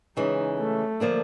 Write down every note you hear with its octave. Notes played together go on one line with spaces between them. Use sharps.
C#3 E3 G#3 D#4
A3
D3 F3 A#3 D4